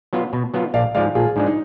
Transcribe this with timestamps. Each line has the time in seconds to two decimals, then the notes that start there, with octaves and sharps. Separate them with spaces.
0.13 F#3 B3 F4
0.33 B2
0.54 F#3 B3 F4
0.74 A#1 D5 F5
0.95 G#2 F3 G#3 D5 F5
1.15 A#1 F4 G#4
1.36 G#2 F3 G#3 D4
1.46 D#4